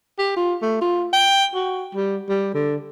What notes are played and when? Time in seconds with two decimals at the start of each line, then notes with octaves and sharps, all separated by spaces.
0.19 G4
0.37 F4
0.62 A3
0.81 F4
1.13 G5
1.54 F#4
1.95 G3
2.29 G3
2.54 D3